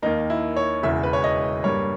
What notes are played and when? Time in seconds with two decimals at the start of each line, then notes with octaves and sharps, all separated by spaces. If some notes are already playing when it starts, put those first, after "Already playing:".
0.02 D#2 D#3 A#3 D#4
0.30 E4
0.57 C#5
0.83 E1 E2 C#3 E5
1.03 B4
1.13 C#5
1.24 D#5
1.64 G2 G3 A#3 C#5